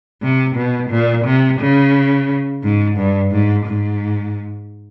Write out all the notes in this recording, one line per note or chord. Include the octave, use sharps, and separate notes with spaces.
C3
B2
A#2
C3
C#3
G#2
G2
G#2
G#2